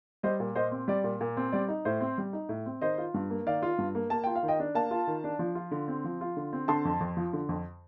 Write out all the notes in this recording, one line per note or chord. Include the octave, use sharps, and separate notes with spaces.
G3 C5 D#5
A#2
A#2 C5 D#5
C4
G3 D5
A#2
A#2
C4
G3 D5
D#4
A2 C5
C4
G3
D#4
A2
C4
D#3 C5 D#5
F4
G2
A#3
D#3 D5 F5
F4
G2
A#3
A#3 A5
F4 G5
F5
D#3
D#5 G5
D4
A#3 F5 A5
F4
D#3
D4
F3
F4
D3
C4
F3
F4
D3
C4
D3 A5 C6
F2
F2
F3
D3
F2